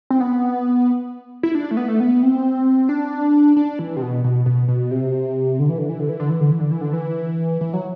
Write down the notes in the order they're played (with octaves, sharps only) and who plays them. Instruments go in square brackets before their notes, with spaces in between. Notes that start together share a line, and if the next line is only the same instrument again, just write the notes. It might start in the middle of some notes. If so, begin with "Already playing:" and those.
[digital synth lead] C4
B3
E4
D4
A3
B3
A3
B3
C4
D4
D4
E3
C3
B2
B2
B2
B2
C3
D3
E3
D3
E3
D3
E3
D3
E3
D3
E3
D3
E3
D3
E3
E3
F#3